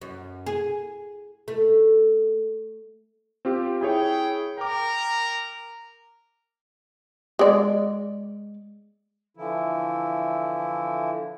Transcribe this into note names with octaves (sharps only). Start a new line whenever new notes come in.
F#2
G#4
A3
C4 F4 G4
E4 G#4 C#5 G5
A#4 G5 D6
G#3 D5
D3 E3 F3 E4